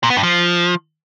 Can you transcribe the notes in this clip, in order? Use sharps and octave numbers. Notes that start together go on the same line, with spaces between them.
A#2
B3
G2
F3